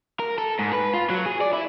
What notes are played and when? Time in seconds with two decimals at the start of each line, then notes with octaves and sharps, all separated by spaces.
0.20 A#4
0.38 A4
0.59 G#2
0.73 B4
0.94 F4
1.10 F#3
1.26 G#4
1.41 D5
1.53 E4